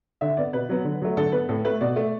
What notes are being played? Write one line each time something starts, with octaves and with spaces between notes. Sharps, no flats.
D3 E5
B3 D5
B2 B4
F#3 B3
D3
F#3 A3
D3 A4
B3 B4
A2 A4
A3 B4
B2 D5
A3